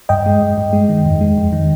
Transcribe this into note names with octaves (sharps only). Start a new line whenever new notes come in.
G2 D#5 G5
G#3
G2
G2
G#3
D#3
F2
G#3
F2
D#3